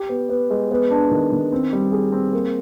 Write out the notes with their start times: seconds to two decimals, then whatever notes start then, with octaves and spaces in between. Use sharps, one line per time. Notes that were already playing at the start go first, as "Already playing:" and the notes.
Already playing: G4
0.09 B3
0.29 B3
0.50 G#3
0.71 B3
0.91 D4
1.11 D#3
1.32 D#3
1.52 C4
1.73 G3
1.92 G#4
2.12 C4
2.33 A#3